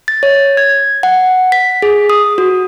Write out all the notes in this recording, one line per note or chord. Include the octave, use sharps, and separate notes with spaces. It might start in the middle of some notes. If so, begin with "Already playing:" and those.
A6
C#5
G#6
F#5
B6
G#4
D#6
F#4